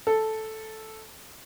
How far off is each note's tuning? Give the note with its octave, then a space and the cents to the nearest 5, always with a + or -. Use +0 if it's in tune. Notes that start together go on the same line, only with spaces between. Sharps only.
A4 -5